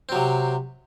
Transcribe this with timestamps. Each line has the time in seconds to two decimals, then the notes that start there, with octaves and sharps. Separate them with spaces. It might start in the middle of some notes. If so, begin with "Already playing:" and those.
0.09 C4
0.12 F#3
0.15 C3